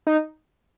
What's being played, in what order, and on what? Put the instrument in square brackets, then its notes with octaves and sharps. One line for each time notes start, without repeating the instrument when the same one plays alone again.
[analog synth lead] D#4